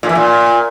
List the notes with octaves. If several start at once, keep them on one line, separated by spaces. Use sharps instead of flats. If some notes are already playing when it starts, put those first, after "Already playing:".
A#2
E3
A#2